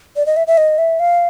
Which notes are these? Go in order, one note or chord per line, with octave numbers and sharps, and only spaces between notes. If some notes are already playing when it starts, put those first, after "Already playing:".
D5
D#5
E5
E5
D#5
E5
F5